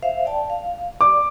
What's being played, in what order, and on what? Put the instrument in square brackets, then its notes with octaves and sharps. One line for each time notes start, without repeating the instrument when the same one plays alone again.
[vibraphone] C5 E5 F5
D5 G5 A5
F5
[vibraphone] D5 [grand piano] D6